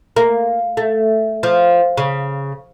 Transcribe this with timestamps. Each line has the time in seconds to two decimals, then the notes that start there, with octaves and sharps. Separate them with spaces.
0.16 A#3
0.77 A3
1.43 F3
1.97 C#3